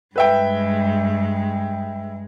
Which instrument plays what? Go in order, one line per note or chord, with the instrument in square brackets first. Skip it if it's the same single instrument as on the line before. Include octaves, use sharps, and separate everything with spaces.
[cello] G2 G#3 [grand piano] B4 E5 G5